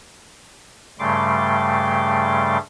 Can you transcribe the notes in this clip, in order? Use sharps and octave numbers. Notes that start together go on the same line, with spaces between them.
G2 C#3 G3 A3 C6 D6